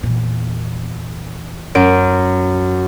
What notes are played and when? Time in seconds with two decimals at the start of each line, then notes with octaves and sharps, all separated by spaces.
0.03 E2 A#2
1.75 F#2 D7